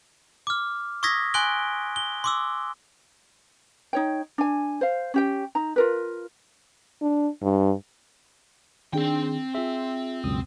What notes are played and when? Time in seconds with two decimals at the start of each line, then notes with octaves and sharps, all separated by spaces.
0.47 D6 F6
1.03 C#6 D#6 E6 G#6 A#6 B6
1.34 G#5 C6 F#6 D7 G7
1.96 G7
2.24 C6 D6 E6
3.93 D#4 C#5 G5
4.38 D4 G#5
4.81 C5 F5
5.14 C#4 G4 G5
5.55 D#4 A#5
5.76 F4 A#4 B4
7.02 D4
7.42 G2
8.93 D#3 C4 D4 G#4 G5
9.55 F4 G#4 E5
10.24 C#2 F#2 B2 D#6